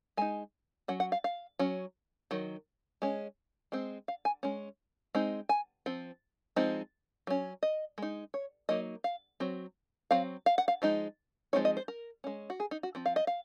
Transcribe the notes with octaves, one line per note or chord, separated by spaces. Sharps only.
G#3 D#4 G#5
F#3 C#4 F#5
F#5
F5
F5
F#3 C#4
D#3 F#3
G#3 C#4
G#3 C4
F5
G#5
G#3 C#4
G#3 C4 D#4
G#5
F3 C4
F3 G#3 C4 D#4
F#3 C#4
D#5
G#3 D#4
C#5
F#3 A#3 D#4 D#5
F5
F#3 C4
F#3 C4 F5
F5
F#5
F5
F3 G#3 D#4
F3 G#3 C4 D#4 C#5
D#5
C5
A#4
G#3 C#4
F#4
G#4
D#4
F#4
F3 C4
F5
D#5
F5